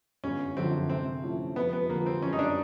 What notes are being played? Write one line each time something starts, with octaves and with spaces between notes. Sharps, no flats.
G1 C#4
F#2 D3 F3 C4
C3 C4
F3 A3 C#4 E4
F2 B3
B3
D3 F3 A#3
C4
F#1 C#4
D#4
D4